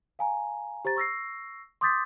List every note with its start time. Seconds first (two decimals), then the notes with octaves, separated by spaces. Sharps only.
0.19 F5 G#5 A#5
0.85 G4 C5 A#5 A6
0.96 C#6 E6 A#6 C7
1.81 C6 D6 D#6 G6 A6 B6